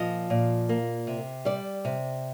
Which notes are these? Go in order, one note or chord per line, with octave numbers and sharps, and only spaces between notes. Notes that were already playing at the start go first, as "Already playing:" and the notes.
Already playing: A#2 F3 D#5
A#2
A#3
C3
G3 D5
C3